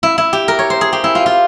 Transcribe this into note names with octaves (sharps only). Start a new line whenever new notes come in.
E4
E4
G4
A#4
C#5
C5
G#4
G4
E4
F4
F4